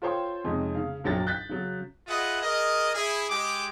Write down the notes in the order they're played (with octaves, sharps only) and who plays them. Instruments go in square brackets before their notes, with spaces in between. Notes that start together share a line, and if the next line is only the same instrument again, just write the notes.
[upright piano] F4 A4 C5 C#5 G5 C6
F2 C3 G#3 C#4 D#4
C#3 F5
A#1 F#2 F#3 G5 A6
F#6 G6 A6 B6
C#3 F#3
[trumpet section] F4 G#4 B4 D#5 E5 F#5
G#4 A#4 D5 D#5
E4 G#4
G#3 G4 D6